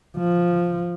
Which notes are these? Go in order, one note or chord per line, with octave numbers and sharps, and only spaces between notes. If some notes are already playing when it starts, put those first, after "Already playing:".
F3